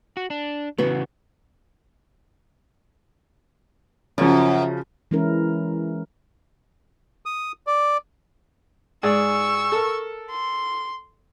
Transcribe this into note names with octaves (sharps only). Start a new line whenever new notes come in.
F#4
D4
C#3 E3 B3 F#4
F#2 C#3 F3
E3 G#3 C#4 E4 A#4
D#6
D5
G#2 G#4 D5 C#6 E6
A4 A#4
C6